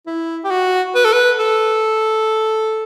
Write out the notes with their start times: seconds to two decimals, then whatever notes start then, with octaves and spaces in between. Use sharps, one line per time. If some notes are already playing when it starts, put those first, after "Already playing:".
0.07 E4
0.44 G4
0.51 F#4
0.95 B4
1.05 A4
1.13 B4
1.39 A4